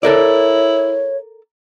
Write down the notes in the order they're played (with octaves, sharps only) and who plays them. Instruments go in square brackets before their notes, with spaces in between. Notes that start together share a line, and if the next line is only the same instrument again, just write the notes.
[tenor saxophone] E4 [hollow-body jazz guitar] A4 A#4 D5 [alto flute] C#5